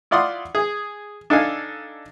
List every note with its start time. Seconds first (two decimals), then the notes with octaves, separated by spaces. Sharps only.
0.11 E4 F4 D5 F#5 C6 D#6
0.55 G#4
1.30 D4 D#4 A4 F5 G#5